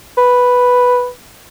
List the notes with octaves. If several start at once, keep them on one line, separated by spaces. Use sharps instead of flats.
B4